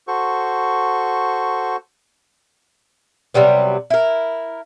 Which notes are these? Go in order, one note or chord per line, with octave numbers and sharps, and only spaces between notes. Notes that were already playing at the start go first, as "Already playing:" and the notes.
F#4 A4 C5 C#6
C3 F#3 G3 B3
E4 A#4